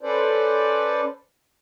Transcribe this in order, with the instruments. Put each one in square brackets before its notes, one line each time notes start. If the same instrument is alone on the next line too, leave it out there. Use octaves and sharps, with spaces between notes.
[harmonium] C#4 A4 B4 C5 D5